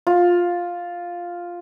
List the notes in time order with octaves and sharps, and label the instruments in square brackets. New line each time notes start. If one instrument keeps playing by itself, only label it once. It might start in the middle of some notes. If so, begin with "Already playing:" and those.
[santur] F4